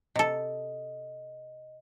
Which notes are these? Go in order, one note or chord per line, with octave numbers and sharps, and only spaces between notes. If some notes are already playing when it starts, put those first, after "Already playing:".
C3 A4 D#5